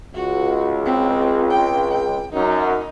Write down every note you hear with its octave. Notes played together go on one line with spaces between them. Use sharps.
C#2 F#4
C4
G5
G5
F#2 D#4